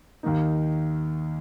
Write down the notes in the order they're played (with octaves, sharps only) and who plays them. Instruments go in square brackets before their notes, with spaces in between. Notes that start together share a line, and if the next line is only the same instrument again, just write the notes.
[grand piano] D#2 D#3 A#3 D#4